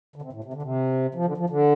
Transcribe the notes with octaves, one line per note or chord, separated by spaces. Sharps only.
D3
C3
A2
C3
D3
C3
F3
D3
F3
D3